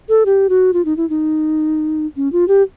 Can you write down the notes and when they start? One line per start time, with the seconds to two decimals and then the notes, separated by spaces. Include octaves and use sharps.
0.09 A4
0.26 G4
0.49 F#4
0.74 F4
0.85 D#4
0.97 E4
1.10 D#4
2.17 C#4
2.33 F4
2.48 G4